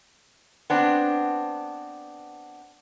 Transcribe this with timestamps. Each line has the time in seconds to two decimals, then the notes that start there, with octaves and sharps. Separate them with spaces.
0.70 B3 C4 D4